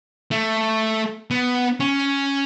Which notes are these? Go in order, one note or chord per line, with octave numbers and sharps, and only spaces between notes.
A3
B3
C#4